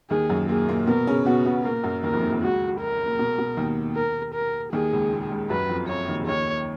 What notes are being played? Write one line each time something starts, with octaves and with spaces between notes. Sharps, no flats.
D#2 D#3 G#4
F#2 F#3
A#2 A#3 G#4
A#2 A#3
B2 B3 A#4
C#3 C#4
B2 B3 F#4
B2 B3
A#2 A#3 A#4
F#2 F#3
D#2 D#3 A#4
F2 F3
D#2 D#3
F2 F3
C#2 C#3 F#4
A#4
A#2
B2
B2
D#2 D#3
A#4
A#4
D#2 D#3 G#4
C#2 C#3
A#2
C#2 C#3
F#2 F#3 B4
F2 F3
F2 F3 C#5
D#2 D#3
C#3
D#2 D#3 C#5